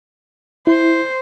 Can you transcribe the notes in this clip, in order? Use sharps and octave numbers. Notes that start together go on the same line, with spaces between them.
E4 C5